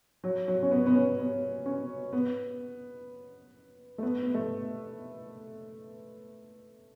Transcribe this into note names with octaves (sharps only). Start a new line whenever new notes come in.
F#3
F#3
C#4
B3
B3
C#4
B3
C#4
B3
A3
B3
B3
A3